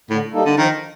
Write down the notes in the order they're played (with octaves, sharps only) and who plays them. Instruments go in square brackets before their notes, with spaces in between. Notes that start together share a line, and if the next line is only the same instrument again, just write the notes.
[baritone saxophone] A2 [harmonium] D3
[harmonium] G3 A#3 D#4 A4
[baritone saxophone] D3
[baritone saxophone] D#3 [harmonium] F3